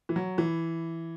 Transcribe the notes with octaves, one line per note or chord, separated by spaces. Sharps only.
E3
F#3
E3